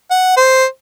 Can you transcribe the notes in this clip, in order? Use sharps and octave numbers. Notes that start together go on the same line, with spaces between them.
F#5
C5